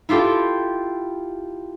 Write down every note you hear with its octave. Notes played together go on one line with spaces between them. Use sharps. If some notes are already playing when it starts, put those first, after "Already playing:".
E4 F4 G4 A4 G5